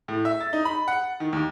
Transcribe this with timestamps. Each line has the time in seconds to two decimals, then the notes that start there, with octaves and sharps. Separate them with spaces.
0.08 A2
0.25 E5
0.41 A6
0.53 D#4
0.65 B5
0.88 F#5
1.20 D#3
1.33 D#2